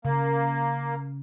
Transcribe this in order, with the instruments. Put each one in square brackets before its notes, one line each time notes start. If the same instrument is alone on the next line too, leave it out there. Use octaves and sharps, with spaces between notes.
[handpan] C#3 [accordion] A#3